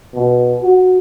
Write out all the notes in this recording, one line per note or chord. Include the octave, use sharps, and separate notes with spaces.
B2
F#4